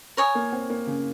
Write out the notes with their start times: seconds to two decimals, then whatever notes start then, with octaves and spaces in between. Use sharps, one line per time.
0.17 A#4 C#5 G#5 D#6
0.35 A#3
0.52 C4
0.70 A#3
0.87 C#3